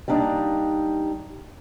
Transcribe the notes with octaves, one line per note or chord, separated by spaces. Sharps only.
G3 A#3 D4 D#4